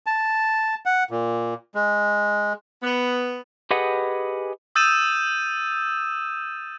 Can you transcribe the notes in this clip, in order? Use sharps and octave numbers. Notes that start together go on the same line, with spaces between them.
A5
F#5
A#2
G#3
B3
G4 G#4 B4 D#5 F#5
D#6 E6 G6 A6 D#7 E7